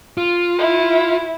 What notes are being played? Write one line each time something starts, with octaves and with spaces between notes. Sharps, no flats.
F4
E4